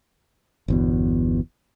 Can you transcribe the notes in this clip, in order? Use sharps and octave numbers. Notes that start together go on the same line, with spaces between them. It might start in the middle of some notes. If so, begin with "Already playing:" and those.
G1 E2 B2